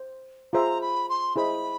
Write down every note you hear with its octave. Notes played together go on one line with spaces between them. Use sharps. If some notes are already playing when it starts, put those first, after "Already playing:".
Already playing: C5
F4 G#4 C5 E5 A#5
B5
C6
E4 G#4 C5 D#5 B5